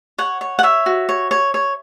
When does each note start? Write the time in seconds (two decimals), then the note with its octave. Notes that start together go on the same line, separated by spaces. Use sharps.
0.18 C#5 F#5
0.41 C#5
0.59 F#5
0.63 C#5 E5
0.86 F#4
1.09 C#5
1.31 C#5
1.54 C#5